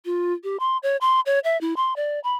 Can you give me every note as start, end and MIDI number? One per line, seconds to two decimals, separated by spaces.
0.05 0.33 65
0.44 0.57 67
0.60 0.77 84
0.83 0.97 73
1.01 1.20 84
1.26 1.39 73
1.44 1.59 76
1.61 1.74 64
1.76 1.96 84
1.96 2.20 74
2.24 2.36 83